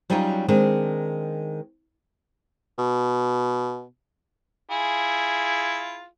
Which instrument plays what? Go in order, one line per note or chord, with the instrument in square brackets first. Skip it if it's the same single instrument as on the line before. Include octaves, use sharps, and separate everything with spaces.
[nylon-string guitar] F#3 G3 C#4 D#4 F4 C#5
D#3 G#3 C4 D4
[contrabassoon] B2
[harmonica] E4 F4 G#4